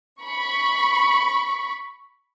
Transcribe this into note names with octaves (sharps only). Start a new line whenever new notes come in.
B5 C#6